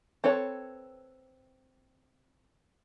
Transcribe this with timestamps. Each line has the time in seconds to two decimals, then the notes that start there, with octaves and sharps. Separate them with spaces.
0.24 C4 A4 B4 C#5